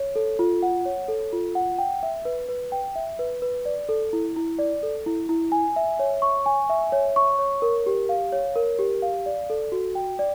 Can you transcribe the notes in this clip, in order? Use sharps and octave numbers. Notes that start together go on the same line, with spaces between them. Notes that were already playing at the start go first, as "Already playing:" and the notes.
Already playing: C#5
A4
F4
F#5
C#5
A4
F4
F#5
G5
E5
B4
B4
G5
E5
B4
B4
D5
A4
E4
E4
D5
A4
E4
E4
G#5
E5
C#5
C#6
G#5
E5
C#5
C#6
C#5
A#4
G4
F5
C#5
A#4
G4
F5
D5
A4
F#4
G5
D5